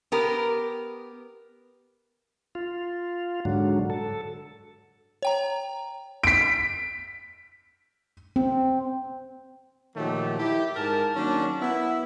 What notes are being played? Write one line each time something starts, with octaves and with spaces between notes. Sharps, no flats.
B3 G4 A#4
F4
G#2 D3 F#3
A4
C#5 G5 A#5
B6 D7
C4
A#2 D#3 F3 F#3 A3 G4
E4 G4
G#2 A#4 A5
D#3 F#3 A#3 C#4 D4
B3 E4